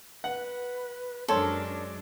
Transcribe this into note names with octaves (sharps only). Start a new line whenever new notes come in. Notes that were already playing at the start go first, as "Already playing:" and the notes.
B4 F#5
F#2 G#3 D4 A4 A#4 C5 C#5 C6